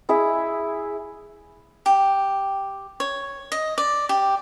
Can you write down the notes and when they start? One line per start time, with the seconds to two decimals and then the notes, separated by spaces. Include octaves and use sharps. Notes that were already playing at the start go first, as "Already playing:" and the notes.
0.09 E4 G#4 E5
1.86 G4
3.00 C#5
3.52 D#5
3.78 D5
4.09 G4